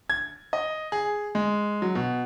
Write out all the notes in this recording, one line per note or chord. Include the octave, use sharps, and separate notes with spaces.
G#6
D#5
G#4
G#3
F#3
B2